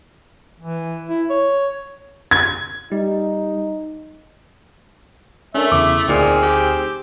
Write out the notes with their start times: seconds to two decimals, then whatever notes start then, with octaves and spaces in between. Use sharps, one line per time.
0.60 E3
1.08 E4
1.30 C#5
2.31 G#6
2.92 G3 D#4
5.55 A3 C#4 D4 A#4 E5
5.72 E2 C#3 E4 D6
6.08 D2 A#2 C4 D#4 G#4 F6
6.42 G4